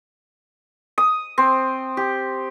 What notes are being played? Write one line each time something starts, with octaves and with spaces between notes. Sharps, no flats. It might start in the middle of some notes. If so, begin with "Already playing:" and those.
D#6
C4
G4